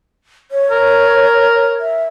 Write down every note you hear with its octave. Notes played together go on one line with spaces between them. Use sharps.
C#5
A#4
E5